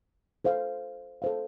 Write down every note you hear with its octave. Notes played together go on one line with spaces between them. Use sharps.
A4 C5 F5
A4 C5 F5